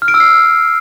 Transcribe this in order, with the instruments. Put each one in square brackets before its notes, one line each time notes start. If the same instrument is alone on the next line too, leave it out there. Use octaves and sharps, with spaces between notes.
[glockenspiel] F6
D7
E6
C7